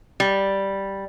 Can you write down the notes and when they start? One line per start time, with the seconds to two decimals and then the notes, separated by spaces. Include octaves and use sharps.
0.20 G3